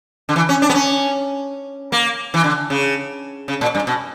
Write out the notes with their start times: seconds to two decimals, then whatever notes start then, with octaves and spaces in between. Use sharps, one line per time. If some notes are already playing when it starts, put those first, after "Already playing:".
0.29 D3
0.36 E3
0.49 C#4
0.62 D4
0.69 B3
0.74 C#4
1.92 A#3
2.34 E3
2.44 D3
2.70 C#3
3.48 C#3
3.61 A#2
3.75 G2
3.87 B2